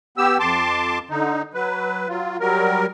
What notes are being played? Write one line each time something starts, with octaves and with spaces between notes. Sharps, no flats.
B3 G4 E6
F2 A5 C6 D6
D3 D#4
F#3 B4
F#3 F4
F#3 G3 A#4